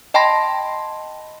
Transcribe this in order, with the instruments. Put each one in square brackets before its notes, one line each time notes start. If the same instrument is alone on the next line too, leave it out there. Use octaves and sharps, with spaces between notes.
[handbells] D#5 G5 A5 B5 C6 A#6